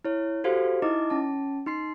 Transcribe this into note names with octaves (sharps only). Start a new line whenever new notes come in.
E4 C#5
F#4 G4 A4 C5 F5
D#4 E4 D#5 D6
C#4 A5
D#4 C6 C7